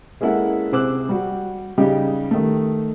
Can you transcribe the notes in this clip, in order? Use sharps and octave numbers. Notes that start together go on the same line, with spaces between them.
G#3 A#3 C#4 E4 A4 F#5
C3 G#4 C5 D6 E6 F#6
G3 F#4
C#3 G3 D#4 G4
D#3 A3